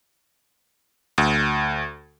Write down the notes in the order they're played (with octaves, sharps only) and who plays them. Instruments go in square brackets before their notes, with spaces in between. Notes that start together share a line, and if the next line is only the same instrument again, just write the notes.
[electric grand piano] D2